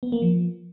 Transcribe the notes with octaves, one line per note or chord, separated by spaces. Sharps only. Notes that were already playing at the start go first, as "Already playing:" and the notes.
B3
A#3
F3